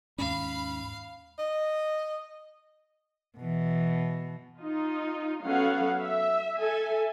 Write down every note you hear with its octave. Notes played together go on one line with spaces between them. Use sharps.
D#2 G#2 C#4 F5 B5
D#5
B2 E3
D#4 F4
F#3 B3 C#4 A4 F5 F#5
E5
A4 E5 G#5